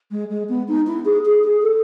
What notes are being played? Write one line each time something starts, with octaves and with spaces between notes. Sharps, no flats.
G#3
G#3
B3
D#4
E4
G#4
G#4
G#4
A4